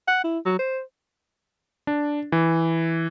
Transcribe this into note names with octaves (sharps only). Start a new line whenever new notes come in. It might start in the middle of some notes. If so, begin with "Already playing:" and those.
F#5
E4
F#3
C5
D4
E3